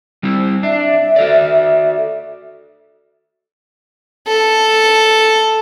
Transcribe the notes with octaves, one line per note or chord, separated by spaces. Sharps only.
G3 C4 E4
D4 E5
F#4 A4 D5
A4